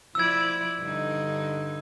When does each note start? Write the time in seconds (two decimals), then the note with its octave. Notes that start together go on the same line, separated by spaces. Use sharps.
0.15 F3 E4 D5 E6 G#6
0.80 G2 D3 D#4